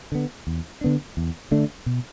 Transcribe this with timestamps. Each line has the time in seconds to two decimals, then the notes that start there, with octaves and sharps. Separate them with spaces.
0.12 D3 B3
0.47 E2
0.81 D3 B3 D4
1.17 E2
1.51 D3 A3 D4
1.86 B2